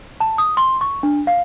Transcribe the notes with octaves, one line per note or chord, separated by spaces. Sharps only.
A5
D#6
C6
C#6
D4
F5